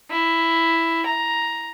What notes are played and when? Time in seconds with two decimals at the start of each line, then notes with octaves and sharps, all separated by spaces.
0.11 E4
1.06 A#5